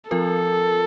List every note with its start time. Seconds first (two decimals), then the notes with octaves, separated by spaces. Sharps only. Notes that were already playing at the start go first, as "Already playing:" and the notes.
0.10 F3 C4 F4 A4 A#4